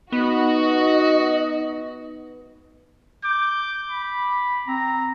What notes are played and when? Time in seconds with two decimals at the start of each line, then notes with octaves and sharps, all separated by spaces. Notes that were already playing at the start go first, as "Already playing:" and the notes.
0.12 B3 D#4 F#4 D#5
3.24 D6 G6
3.90 B5
4.68 C4 A#5